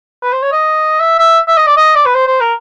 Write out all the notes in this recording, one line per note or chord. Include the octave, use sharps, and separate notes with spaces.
B4
C5
C#5
D#5
E5
E5
E5
D#5
D5
D#5
D5
B4
C5
C5
A#4